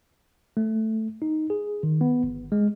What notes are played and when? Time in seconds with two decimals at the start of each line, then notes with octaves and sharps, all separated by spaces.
0.57 A3
1.22 D#4
1.50 G#4
1.83 D#3
2.01 B3
2.24 G1
2.52 G#3